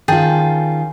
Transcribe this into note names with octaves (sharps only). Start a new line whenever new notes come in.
D#3 C#4 F4 G#4 G5 A5